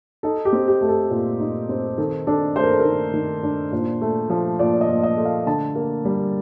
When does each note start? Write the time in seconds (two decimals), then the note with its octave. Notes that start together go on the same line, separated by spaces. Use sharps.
0.23 D#4 A4
0.45 G4
0.53 C4
0.68 G4
0.81 A3
0.89 A4
1.10 A#2
1.40 D#4
1.69 C4
1.98 D#3 A4
2.27 D4 A4
2.56 A3 C5
2.63 A#4
2.71 A4
2.79 A#4
2.85 D#3
3.14 D#3
3.43 D4
3.72 A#2 C5
4.01 A3
4.30 F3
4.59 A#2 D5
4.81 D#5
4.89 A#2
5.03 D#5
5.17 A3
5.25 F5
5.47 D3 A5
5.75 A#3
6.05 G3